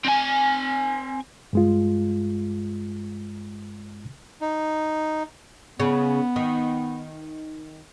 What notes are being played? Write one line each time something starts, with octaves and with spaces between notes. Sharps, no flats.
C4 G#5
G2 G#3 F4
D#4
C#3 B3
D#3